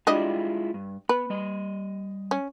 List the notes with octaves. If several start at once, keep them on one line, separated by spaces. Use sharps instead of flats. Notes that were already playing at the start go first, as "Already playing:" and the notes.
G3 G#3 D4 E4 F4 D#5
G2
B3 B4
G3 D#5
C#4